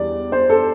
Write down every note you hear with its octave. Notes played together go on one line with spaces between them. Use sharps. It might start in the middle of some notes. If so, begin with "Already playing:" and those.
Already playing: E2 G3 D5
C5
A4